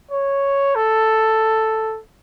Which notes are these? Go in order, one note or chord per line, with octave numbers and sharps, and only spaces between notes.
C#5
A4